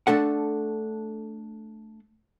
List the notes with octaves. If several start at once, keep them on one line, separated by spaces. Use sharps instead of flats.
A3 D4 A4 F#5